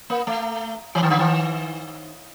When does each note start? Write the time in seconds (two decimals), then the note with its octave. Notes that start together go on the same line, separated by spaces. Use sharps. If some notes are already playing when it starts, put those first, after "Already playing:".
0.10 A#3
0.27 A3
0.95 E3
1.03 D#3
1.10 D3
1.19 D#3